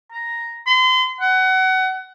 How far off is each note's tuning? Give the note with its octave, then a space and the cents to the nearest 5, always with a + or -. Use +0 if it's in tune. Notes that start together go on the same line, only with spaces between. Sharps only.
A#5 +0
C6 -35
F#5 +25